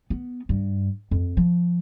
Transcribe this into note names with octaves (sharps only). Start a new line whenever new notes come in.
B3
G2
F2
F3